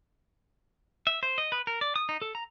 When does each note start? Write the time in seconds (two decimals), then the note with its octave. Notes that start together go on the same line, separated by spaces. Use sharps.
1.07 E5
1.23 C5
1.38 D#5
1.52 B4
1.67 A#4
1.81 D5
1.96 D#6
2.09 D#4
2.22 A4
2.35 A#5